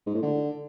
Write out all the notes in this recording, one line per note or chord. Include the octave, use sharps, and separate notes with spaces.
G#2
A2
D3